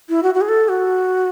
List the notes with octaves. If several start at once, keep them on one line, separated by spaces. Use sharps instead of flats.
E4
F#4
F#4
G#4
A4
F#4